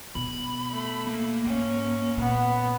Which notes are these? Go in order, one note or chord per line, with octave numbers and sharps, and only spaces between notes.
B2 B5
A3
A#3
G#2 C#4
A#2 B3